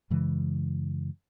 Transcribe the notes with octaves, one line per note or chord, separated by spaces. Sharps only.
F#2 C#3 E3 G#3